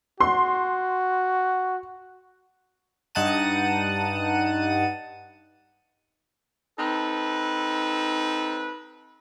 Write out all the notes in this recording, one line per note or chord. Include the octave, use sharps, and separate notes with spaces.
F#4 C6
G2 D#4 F#5 A5 D#7
C4 D#4 A4 B4